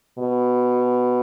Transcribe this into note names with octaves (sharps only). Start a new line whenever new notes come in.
B2